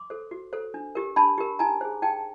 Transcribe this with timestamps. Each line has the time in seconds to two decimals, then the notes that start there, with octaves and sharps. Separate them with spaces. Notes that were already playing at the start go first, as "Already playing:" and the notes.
Already playing: C6 D6
0.10 A4 C5
0.31 F#4
0.53 A4 C5
0.74 D4
0.95 G4 A#4
1.16 D4 A5 B5
1.38 G4 A#4
1.59 D#4 G#5 A#5
1.81 G#4 C5
2.02 D#4 G5 A5